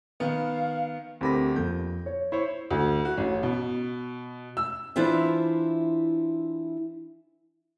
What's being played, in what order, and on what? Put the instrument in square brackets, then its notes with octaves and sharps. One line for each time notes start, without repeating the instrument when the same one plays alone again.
[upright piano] D#3 B3 [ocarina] F5
[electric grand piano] D2 B5 A#6 [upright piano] C4 G4 A#4
[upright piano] F2 [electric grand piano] G6
[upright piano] C#5
[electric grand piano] E4 C5 C#5 [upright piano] C#6
[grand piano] D2
F#4
A1
B2
E6
[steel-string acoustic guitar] E3 D4 E4 F4 C5 E5